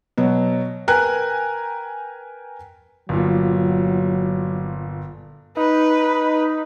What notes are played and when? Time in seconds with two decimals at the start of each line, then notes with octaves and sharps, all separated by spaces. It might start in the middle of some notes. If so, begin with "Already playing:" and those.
0.18 B2 F#3
0.88 A#4 B4 G5 G#5 A#5 F#6
3.09 G1 A#2 F#3
5.57 D#4 B4